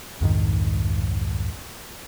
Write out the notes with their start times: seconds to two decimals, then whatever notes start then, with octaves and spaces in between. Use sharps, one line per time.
0.21 C2 F2 G#2 D#3